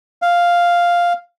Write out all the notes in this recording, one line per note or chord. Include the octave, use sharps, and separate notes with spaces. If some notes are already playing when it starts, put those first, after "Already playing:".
F5